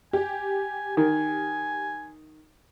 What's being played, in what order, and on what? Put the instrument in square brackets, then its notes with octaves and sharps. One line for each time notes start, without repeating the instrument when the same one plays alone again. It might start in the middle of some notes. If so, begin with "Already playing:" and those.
[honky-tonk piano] G4 [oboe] G#5
[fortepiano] D#3 [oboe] G#5